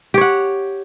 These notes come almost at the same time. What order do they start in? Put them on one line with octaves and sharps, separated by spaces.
G4 C#5 F#5